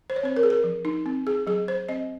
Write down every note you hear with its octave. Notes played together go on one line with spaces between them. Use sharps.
C5
C#5
C4 C5
A#4
G#4
A#4
F3
D#4
C4
G#4
F#3 G#4
C5
C4 D#5